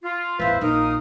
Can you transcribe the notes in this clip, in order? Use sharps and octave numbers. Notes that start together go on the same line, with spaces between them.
F4
A1 E2 B4 C5 E5 F5
A#1 D#4 A#4 F5 D#6